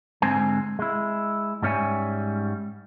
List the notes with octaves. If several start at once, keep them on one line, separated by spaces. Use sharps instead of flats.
G#2 D3 G#3 C4 C5 G#5
G#3 E4
G#2 G3 C#4 C#5 E5 G#5